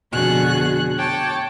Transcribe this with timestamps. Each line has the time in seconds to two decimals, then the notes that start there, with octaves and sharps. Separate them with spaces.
0.11 F2 B2 D3 F#4 G#4 F#6
0.97 C#5 G5 A5 D6